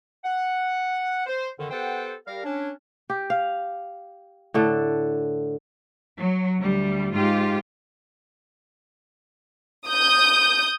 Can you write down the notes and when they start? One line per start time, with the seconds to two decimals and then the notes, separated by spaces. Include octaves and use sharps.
0.24 F#5
1.27 C5
1.59 F2 D3 D#3
1.71 B3 G4 A4 C5 F#5 G5
2.27 G3 A#4 F5
2.44 C#4 D4
3.10 G4
3.30 F5
4.54 A2 D3 A4
6.18 F#3
6.60 D2 G3
7.14 G#2 F4 G4
9.87 D#6 G6